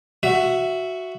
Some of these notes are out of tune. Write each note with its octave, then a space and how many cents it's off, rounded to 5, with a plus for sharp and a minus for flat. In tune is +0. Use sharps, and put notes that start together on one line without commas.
F#4 +0 E5 +10